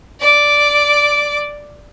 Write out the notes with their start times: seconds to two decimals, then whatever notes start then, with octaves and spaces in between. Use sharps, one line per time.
0.21 D5 D6